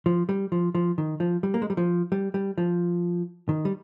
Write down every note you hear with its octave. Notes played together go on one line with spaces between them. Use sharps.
F3
G3
F3
F3
D#3
F3
G3
A#3
G#3
G3
F3
G3
G3
F3
D#3
G3